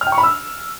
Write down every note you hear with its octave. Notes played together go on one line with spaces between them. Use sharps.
F6
G5
C#6
B5
E6